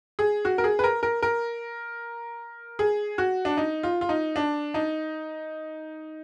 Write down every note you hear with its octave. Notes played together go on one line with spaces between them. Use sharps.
G#4
F#4
A#4
G#4
B4
A#4
A#4
A#4
G#4
F#4
D4
D#4
F4
F4
D#4
D4
D#4